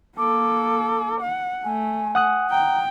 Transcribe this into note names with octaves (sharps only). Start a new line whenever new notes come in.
A#3 A4 D6
F#5
A3 G#5
F#5 D#6 F#6
G5 A#5